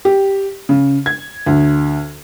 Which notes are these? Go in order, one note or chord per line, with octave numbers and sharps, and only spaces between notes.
G4
C#3
G#6
D2